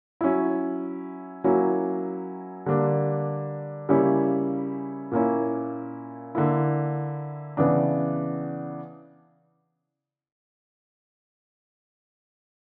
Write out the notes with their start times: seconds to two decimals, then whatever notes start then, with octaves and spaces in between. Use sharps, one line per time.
0.21 F#3 C#4 E4
1.44 F#3 A#3 C#4 E4
2.66 D3 G3 A#3 D4
3.89 C#3 G3 A#3 C#4 E4
5.12 A#2 A#3 C#4 E4
6.35 D3 A#3 E4
7.57 C#3 E3 B3 D4